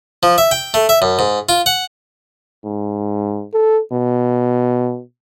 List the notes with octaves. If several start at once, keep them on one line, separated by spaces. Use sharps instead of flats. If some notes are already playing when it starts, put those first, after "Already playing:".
F3
E5
G5
A3
E5
F#2
G#2
F4
F#5
G#2
A4
B2